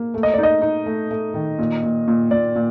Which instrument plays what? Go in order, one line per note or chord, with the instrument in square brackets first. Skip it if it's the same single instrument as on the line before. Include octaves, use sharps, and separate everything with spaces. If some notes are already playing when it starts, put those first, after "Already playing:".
Already playing: [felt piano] A#3
A3
[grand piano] D#5
[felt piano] D#4 [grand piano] D5
[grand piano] D#5
[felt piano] D#4
A3
A3
D#3
A#2
A#2
A#2
[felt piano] A#2 [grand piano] D5
[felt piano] A#2